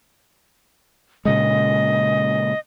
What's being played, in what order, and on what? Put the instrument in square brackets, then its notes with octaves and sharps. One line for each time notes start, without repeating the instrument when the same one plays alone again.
[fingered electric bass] A#2 C#3 G#3 [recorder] D#5